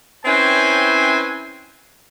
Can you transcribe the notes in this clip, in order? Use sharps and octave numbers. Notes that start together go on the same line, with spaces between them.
C4 C#4 E4 B4 G5 G#5